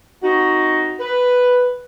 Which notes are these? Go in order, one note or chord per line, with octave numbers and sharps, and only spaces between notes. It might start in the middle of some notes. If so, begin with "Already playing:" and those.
C4 D#4 F#4
B4